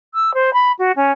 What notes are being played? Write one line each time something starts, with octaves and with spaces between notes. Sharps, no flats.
E6
C5
B5
F#4
C#4